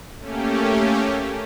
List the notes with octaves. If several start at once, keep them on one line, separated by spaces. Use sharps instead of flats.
A3 A#3 C#4 G4